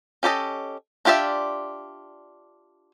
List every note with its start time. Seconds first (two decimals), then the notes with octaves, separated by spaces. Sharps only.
0.23 C#4 G4 A4 D#5
1.05 D4 F4 G4 D5 E5